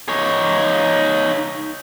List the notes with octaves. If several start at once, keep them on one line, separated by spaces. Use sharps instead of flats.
D#4 C#5